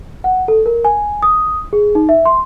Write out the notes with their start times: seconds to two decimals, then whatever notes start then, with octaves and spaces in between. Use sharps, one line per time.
0.24 F#5
0.48 A4
0.66 A#4
0.85 G#5
1.23 D#6
1.73 G#4
1.95 D#4
2.09 E5
2.26 C6